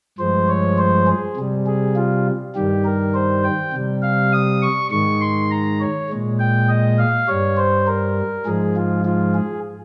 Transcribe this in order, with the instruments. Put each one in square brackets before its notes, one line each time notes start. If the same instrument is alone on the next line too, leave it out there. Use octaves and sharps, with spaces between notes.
[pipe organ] G2 F3 G#3 C5
C#5
C5
G#4
C3 G3
G#4
F4
G2 D#3 G3 G4
A#4
C5
G5
C3 G3
F5
D#6
C#6
G#2 D#3 G#3 C#6
C6
A#5
C#5
A#2 G#3
G5
D#5
F5
G2 G3 C#5
C5
A#4
G#2 F3 G#3 G#4
F4
F4
G#4